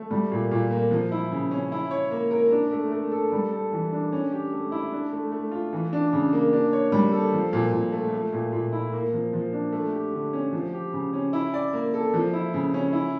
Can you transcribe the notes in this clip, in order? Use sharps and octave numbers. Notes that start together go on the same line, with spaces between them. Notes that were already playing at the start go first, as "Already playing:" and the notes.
Already playing: A3
G3
A#2
A#2
A#3
F3
E4
C#3
C#4
E4
C#5
A#3
A#4
D4
A3
A3
A4
G3
A4
E3
D4
C#4
G4
A3
E4
D4
A3
A3
F4
E3
D4
C#3
A#3
D4
C#5
G3
A4
F3
A#2
A#2
A3
A3
A#2
A#2
E4
A#3
F3
F3
D4
A3
G4
D3
C#4
F3
G4
C#3
C#4
E4
D5
A#3
A4
F3
E4
C#3
C#4
E4